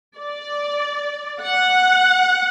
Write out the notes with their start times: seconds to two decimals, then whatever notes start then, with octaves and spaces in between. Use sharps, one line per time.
0.16 D5
1.41 F#5